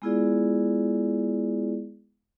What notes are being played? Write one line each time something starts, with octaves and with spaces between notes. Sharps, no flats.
G#3 B3 E4 F4 G#4 D5